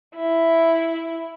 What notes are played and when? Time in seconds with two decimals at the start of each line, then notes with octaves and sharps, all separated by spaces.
0.16 E4